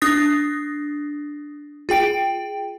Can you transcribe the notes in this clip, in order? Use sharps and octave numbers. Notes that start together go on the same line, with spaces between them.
D4 D#6 A6 A#6
F4 G#4 G5 D7